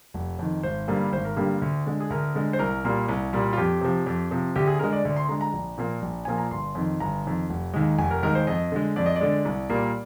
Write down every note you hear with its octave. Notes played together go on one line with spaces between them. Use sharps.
F1
F2 D#3
G#1 C5
G2 D3 G3 A#3
G#1 C5
A#4
G2 D3 G3 A#3 G4
D2
D3 G#3
G#4
D2 A#4
D3 G#3
C5
C2 A#4
A#2 G3 A#3
C2
A#2 G3 A#3
F4
F2 G4
C3 F3
F2
C3 F3
D2 G4
G#4
D3 G#3 A#4
D5
D2 D5
C6
D3 G#3 A#5
A#5
A#1
A#2 F3 A#3
A#1
A#2 F3 A#3 G#5
A#5
G1 C6
F2 D#3
G1 A#5
F2 D#3
F1
D#2 D#3 G#3
F1 G#5
A#4
D#2 D#3 G#3 A#4
C5
F2 D#5
D3 G#3
F2 D5
D#5
D5
D3 G#3
C2
A#2 G3 A#3